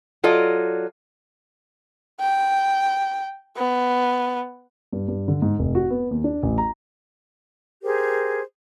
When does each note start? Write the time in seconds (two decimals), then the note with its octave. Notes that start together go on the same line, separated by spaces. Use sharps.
0.24 F#3 F4 A4 D5 D#5
2.21 G5
3.57 B3
4.93 G2
5.08 G2
5.28 D3
5.42 G#2
5.59 F1
5.75 F#4
5.90 B3
6.11 D#2
6.24 D4
6.43 A1
6.58 A#5
7.83 G4 G#4 A#4 C5